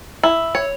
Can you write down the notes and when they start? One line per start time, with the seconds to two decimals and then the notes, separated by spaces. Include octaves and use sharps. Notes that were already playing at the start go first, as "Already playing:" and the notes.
0.23 E4
0.55 C#5